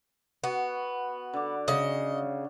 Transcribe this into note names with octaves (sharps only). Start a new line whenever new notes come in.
B3 F#4
D3 D6
C#3 D#5